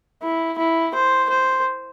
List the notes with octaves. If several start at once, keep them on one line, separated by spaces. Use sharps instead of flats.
E4
E4
C5
C5